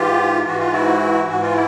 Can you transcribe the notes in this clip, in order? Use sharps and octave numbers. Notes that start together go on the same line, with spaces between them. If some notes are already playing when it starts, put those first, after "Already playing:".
Already playing: G#2 E3 F4 G4
G#2 E3 F#4
F4
E4 F#4
G#2 E3 F#4
F4
E4